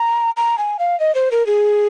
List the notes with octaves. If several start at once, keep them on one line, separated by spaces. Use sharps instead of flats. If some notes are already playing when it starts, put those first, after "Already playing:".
Already playing: A#5
A#5
G#5
F5
D#5
C5
A#4
G#4